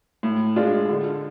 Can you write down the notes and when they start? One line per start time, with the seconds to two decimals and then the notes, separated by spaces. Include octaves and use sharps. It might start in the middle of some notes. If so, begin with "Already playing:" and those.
0.23 A2
0.56 G#3 D4 F4
0.89 D3